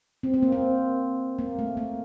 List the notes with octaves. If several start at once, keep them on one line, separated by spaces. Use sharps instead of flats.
C4
C4
A#3
C4
A#3
A3
A#3